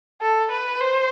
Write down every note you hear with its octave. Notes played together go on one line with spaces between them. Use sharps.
A4
B4
C5